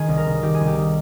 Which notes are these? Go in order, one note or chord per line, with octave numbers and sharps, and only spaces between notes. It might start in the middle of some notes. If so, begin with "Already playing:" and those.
Already playing: D#3 G#4
C2
A#4
C2
D#3 G4
G#4
C2
G4
D#3